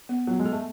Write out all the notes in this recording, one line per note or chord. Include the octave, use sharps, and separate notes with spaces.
B3
F#3 B3
G#3
A4
A3